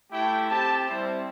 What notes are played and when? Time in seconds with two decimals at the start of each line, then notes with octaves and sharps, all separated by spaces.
0.11 A3 E4 G4 G5
0.49 C4 G4 A5
0.87 G3 C4 E4 C5